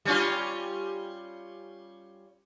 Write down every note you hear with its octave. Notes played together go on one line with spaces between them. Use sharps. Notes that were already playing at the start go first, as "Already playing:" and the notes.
G3 C#4 F4